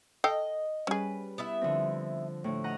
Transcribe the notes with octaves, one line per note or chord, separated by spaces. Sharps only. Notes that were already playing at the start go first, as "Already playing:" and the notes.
A4 D#5 F5 G5
G3 C#4 G#4 B4
B3 E4 E5
D3 F3 C4
A2 D3
D#5 F#5 A#5